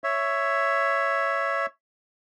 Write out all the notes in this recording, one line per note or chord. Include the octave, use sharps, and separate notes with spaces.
C#5 E5